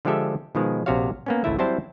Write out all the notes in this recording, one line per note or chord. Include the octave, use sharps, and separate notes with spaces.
D3 F3 G#3 G4 A4 E5
B2 D#3 F3 G#3
A#1 C3 F#4 G#4 C#5 F5
A#3 B3 C#4
G#1 C#2 A3 E4 E5
F#3 G3 C4 E4 C5 A5